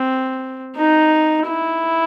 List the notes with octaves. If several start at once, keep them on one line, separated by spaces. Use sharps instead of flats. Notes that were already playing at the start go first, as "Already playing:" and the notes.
Already playing: C4
D#4
E4